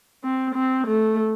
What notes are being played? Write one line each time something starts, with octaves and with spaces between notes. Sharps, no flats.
C4
C4
A3